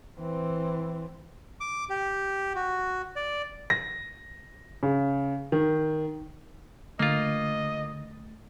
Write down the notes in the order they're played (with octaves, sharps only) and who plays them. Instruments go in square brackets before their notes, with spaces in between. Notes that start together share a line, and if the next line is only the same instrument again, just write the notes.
[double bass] E3 C4
[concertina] D6
G4
F#4
D5
[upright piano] A#6
C#3
D#3
[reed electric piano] D3 [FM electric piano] A3 [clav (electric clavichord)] A#3 F4 [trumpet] D#5